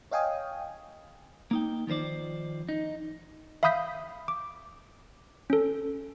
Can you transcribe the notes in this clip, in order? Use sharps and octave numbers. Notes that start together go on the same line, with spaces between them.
C#5 D#5 F5 G5 G#5 D#6
A#3 D#4 G5
D#3 F3 A#4 C5 D5
D#4
E5 F5 B5 D#6 G6 B6
D6
C#4 A4